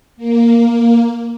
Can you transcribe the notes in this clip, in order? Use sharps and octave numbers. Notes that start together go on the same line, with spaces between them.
A#3